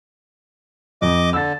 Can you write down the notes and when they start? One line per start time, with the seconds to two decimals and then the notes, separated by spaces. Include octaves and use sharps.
1.02 F2 D#5 D6
1.33 D3 E6 A6